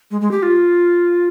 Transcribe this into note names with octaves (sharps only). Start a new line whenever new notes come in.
G#3
G#3
G4
F4